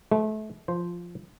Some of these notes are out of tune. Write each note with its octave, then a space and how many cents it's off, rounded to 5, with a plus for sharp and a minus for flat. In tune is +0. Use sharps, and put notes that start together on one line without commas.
A3 -30 B4 +40
F3 +0 C5 +0